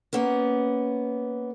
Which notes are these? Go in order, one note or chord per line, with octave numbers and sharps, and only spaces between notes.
A#3 B3 C#4